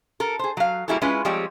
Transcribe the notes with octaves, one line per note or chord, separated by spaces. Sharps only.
A4 A#4
G#4 C5
F#3 F5
G3 A#3 E4 F#4 G#4 A4
G#3 C#4 E4 F4 B4
F3 G3 G#3 C4 G4 C#5